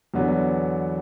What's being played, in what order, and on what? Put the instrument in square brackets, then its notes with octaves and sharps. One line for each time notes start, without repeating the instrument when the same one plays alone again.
[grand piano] E2 D3 F#3 B3